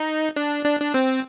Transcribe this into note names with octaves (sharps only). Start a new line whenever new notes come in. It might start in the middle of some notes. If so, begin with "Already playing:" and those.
Already playing: D#4
D4
D4
D4
C4